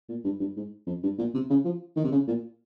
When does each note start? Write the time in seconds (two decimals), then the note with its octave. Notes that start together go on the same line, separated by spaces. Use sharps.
0.09 A#2
0.24 G2
0.40 G2
0.57 G#2
0.87 F2
1.03 G2
1.19 A#2
1.34 C3
1.50 C#3
1.65 F3
1.96 D#3
2.04 C3
2.12 C#3
2.27 A#2